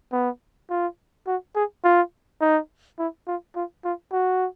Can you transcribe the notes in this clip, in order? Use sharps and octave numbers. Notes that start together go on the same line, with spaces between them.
B3
F4
F#4
G#4
F4
D#4
E4
F4
F4
F4
F#4